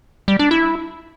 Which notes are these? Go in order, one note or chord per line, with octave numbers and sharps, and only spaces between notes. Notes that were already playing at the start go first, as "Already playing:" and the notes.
G3
D4
E4